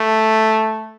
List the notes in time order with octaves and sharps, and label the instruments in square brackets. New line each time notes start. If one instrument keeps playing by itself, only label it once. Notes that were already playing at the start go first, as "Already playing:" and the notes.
Already playing: [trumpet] A3